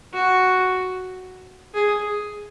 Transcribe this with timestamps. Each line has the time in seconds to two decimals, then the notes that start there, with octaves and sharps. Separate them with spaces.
0.14 F#4
1.74 G#4